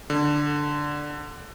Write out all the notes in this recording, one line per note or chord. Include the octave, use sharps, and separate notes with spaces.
D3